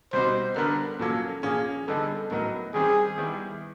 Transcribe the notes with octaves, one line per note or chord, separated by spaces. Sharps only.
B2 G3 C4 D#4 F#4 C5
D3 G3 B3 D4 A#4
A#2 F#3 A#3 C#4 A4
A#2 F3 A#3 C#4 G#4
D3 G3 B3 D#4 G#4 A4
A2 F#3 B3 D#4 A#4
D#3 G3 C4 G#4
D#3 G3 B3 E4